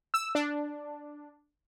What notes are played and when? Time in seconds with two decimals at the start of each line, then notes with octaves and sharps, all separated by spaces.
0.14 E6
0.35 D4